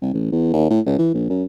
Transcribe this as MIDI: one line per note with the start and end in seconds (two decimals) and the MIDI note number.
0.02 0.11 36
0.14 0.31 33
0.32 0.50 40
0.53 0.68 39
0.71 0.80 45
0.86 0.98 37
0.99 1.12 52
1.14 1.28 34
1.30 1.44 42